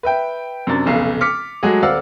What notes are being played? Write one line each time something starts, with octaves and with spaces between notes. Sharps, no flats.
B4 E5 G5
F#2 C3 D4 A6
F1 B1 C#3 C7
D6 F6 B6 C#7 F7
F#3 G#3 A3 F#4 G#4
D#1 C4 D5 F5 F#5 E6